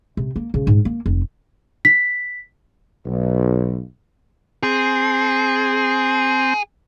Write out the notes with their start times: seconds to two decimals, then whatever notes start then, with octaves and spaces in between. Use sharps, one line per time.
0.17 C3
0.36 A#3
0.54 C#3
0.67 G#2
0.85 A#3
1.06 F1
1.85 B6
3.05 B1
4.63 C4 G#4